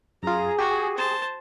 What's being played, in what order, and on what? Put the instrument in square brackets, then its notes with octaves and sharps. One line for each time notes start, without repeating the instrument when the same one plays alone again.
[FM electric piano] F#2 F4 [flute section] G#4 [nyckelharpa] A#5
[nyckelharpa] F#4 [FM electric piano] G4
[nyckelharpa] C5 A5